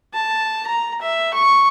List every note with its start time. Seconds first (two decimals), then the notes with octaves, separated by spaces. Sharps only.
0.14 A5
0.66 A#5
1.01 E5
1.34 C#6